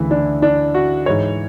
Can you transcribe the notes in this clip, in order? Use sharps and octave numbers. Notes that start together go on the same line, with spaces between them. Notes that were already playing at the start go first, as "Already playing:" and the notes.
Already playing: D2 C#3 E3 E4
D4
D4
F#4
G#2 E3 C#5